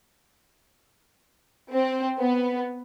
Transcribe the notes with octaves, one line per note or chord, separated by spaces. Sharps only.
C4
B3